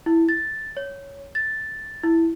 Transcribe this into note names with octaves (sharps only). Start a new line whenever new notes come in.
E4
A6
C#5
A6
E4